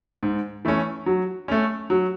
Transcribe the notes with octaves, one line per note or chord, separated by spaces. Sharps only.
G#2
E3 A3 C#4
F#3
A3 C#4
F#3